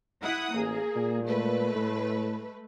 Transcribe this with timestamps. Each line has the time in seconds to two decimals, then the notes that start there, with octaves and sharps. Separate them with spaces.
0.22 E4 F#5 D#6
0.53 A1 A#3 G#4
0.96 A#2
1.24 G#3 A3 B4
1.75 A2